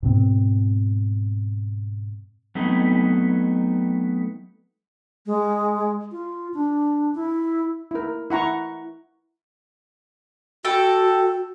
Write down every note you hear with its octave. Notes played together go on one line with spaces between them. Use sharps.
G#2 B2 C4
F#3 A3 B3 C4 D#4
G#3
F4
D4
E4
E4 A#4
E4 F#5 A#5 C#6
F#4 A4 G5